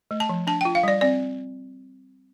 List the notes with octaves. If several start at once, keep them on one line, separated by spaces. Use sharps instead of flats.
A3
A5
F3
D4 A5
F4 G5
F5
G3 D5
C4 D5